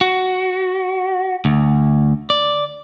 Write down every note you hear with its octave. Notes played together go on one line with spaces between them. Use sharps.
F#4
D2
D5